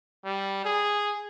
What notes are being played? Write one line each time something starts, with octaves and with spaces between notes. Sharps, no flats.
G3
G#4